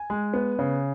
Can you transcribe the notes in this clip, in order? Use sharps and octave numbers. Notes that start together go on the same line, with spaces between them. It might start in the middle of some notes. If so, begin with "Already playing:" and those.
Already playing: G#5
G#3
B3
C#3